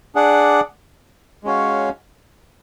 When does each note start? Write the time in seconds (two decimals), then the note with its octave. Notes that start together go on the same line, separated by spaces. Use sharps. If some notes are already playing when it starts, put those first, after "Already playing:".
0.15 D4 G#4 D5 F#5
1.44 G#3 C#4 F#4 C#5 F5